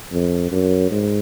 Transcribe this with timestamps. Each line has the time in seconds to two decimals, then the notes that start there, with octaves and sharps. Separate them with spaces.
0.13 F2
0.52 F#2
0.92 G#2